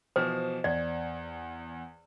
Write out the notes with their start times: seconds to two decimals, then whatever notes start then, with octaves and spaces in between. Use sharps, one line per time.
0.16 B2 E3 F3 C5
0.64 E2 D5